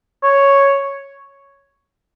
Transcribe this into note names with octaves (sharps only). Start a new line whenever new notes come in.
C#5